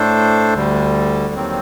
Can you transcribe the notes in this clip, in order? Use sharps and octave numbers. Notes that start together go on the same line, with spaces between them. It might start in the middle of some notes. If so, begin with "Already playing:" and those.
Already playing: A2 A3 D4 A4 C5
D2 D3 G3
D#2 D#3 F#3 C4